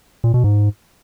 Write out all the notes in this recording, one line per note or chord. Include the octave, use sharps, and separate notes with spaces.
A#2
B2
G#2